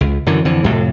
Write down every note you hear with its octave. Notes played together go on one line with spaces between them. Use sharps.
C#2
F#2 D3 E3 F#3
F2 D3 E3
F2 A2 C3